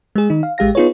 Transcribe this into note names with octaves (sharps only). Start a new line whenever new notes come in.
G#3 G#4
D#3 D#4
F5
A1 G#3 G4 F5 A#6
B3 D#4 F4 G#4 B4 C#5